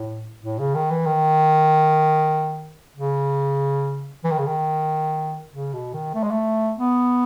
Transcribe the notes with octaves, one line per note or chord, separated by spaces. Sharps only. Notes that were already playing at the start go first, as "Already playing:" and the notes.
Already playing: A2
A2
C#3
D#3
E3
D#3
C#3
E3
D#3
C#3
D#3
C#3
B2
D#3
A3
G#3
A3
B3